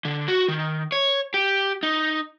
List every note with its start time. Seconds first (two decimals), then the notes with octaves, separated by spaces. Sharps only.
0.05 D3
0.28 F#4
0.48 D#3
0.92 C#5
1.34 G4
1.83 D#4